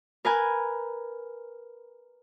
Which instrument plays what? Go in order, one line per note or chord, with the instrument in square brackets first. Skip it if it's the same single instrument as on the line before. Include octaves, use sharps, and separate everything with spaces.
[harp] A#4 B4 G#5